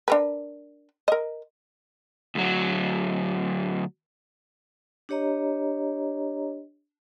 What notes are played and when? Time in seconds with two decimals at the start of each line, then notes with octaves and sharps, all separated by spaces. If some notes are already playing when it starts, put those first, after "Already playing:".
0.08 D4 A#4 B4
1.08 A#4 D#5
2.35 D2 F#3
5.09 D4 G4 C#5 D#5 A#5